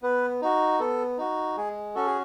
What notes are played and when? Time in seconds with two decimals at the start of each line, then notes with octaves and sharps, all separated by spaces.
0.02 B3 B4
0.42 D#4 F#4
0.79 B3 A4
1.18 D#4 F#4
1.57 G#3 G#4
1.95 C#4 F#4 A4
2.06 G#4